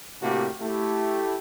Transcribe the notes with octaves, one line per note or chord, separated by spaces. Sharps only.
A2 C3 A3 A#3 F#4 G4
A3 E4 G4